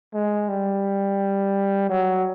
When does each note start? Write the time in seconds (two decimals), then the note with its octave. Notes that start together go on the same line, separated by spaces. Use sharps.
0.14 G#3
0.49 G3
1.89 F#3